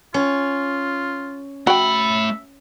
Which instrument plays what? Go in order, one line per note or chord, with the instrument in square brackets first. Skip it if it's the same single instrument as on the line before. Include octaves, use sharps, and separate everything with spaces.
[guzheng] C#4 [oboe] F4
[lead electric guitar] A3 B5 [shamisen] F#4 G5 [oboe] E5